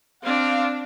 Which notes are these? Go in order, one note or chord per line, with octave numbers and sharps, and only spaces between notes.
C4 D4 F5